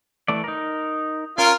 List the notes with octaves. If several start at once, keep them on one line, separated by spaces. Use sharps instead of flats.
E3 A3 D5
D#4 A#4
C#4 F4 A#4